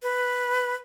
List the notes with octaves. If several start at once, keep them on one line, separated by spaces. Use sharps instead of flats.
B4